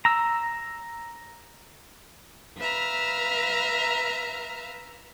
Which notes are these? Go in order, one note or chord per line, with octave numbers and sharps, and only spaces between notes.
A#5 E6
B4 E5 F5 A#5